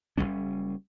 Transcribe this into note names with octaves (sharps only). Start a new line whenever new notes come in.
F#1 E2 G3 C#4